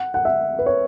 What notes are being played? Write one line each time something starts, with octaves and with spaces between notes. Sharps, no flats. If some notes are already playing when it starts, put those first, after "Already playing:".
Already playing: F#5
F#5
E5
B4
C#5